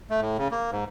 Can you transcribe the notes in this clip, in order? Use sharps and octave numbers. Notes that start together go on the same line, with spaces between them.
A3
A2
C#3
A#3
G#2